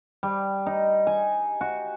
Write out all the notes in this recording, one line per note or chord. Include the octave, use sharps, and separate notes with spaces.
G3
D#4
G#5
F#4